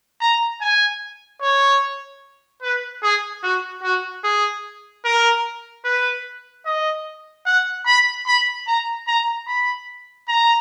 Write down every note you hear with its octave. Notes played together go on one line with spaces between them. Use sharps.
A#5
G#5
C#5
B4
G#4
F#4
F#4
G#4
A#4
B4
D#5
F#5
B5
B5
A#5
A#5
B5
A#5